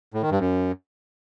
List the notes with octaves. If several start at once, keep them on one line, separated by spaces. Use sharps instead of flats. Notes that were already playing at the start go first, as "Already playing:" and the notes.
A2
D#3
G2
F#2